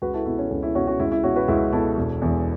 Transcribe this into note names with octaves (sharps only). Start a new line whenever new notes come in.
C#2 F#4 B4
E4 A4
B2 E4
C#4
C#2 C#4
E4
B2 C#4 F#4
C#4 F#4
C#2 E4
E4
B2 C#4 F#4
F#4 B4
C#2 E4
B2 E4 A4
E1
E2 E3